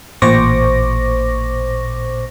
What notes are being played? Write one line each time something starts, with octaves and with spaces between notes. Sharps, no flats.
A1 A#2 C5 C#6 D6 A#6